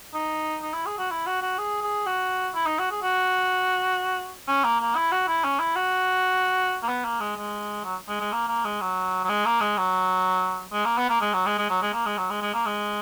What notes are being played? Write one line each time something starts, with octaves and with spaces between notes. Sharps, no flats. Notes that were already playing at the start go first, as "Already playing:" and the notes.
D#4
D#4
E4
G#4
F#4
E4
F#4
F#4
G#4
G#4
F#4
E4
D#4
F#4
G#4
F#4
C#4
A#3
A#3
E4
F#4
E4
C#4
E4
F#4
A#3
B3
A#3
G#3
G#3
F#3
G#3
G#3
A#3
A#3
G#3
F#3
F#3
G#3
A#3
G#3
F#3
G#3
A#3
B3
A#3
G#3
F#3
G#3
G#3
F#3
G#3
A#3
G#3
F#3
G#3
G#3
A#3
G#3